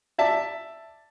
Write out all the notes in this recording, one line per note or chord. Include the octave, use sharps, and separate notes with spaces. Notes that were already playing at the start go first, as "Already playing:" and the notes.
D5 E5 A5